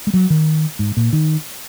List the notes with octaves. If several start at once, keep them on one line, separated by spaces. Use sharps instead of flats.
G#3
F#3
D#3
G#2
A#2
D#3